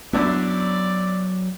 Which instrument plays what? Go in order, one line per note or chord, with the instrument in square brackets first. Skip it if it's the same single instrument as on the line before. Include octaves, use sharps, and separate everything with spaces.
[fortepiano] F#2 D4 E4 [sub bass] F#3 [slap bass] B3 C#4 [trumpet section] D5